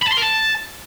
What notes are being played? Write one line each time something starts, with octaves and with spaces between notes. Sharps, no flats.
B5
A5
C6
A#4
A5